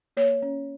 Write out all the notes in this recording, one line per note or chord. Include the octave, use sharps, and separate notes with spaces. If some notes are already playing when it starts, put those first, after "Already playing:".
A#3 C#5
C#4